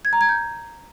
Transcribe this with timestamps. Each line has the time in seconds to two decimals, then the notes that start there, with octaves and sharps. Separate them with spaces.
0.05 G#6
0.13 A#5
0.21 G#6
0.29 G6